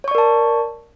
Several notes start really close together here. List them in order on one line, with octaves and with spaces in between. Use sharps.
C#5 C#6 D5 A#4 A5